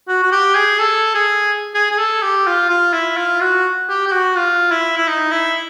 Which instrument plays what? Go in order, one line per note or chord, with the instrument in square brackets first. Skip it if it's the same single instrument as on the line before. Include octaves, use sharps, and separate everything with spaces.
[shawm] F#4
F#4
G4
G#4
A4
G#4
G#4
G#4
A4
G4
F4
F4
E4
F4
F#4
G4
G4
F#4
F4
E4
E4
D#4
E4